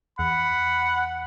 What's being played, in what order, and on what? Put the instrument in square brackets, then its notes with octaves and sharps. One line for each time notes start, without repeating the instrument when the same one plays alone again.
[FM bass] E2 [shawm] F#5 [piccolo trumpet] B5